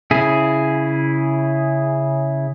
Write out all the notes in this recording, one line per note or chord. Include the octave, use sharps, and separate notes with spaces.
C#3 E4 G#4